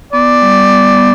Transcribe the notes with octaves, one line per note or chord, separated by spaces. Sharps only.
B3 D5
G3
B3
B3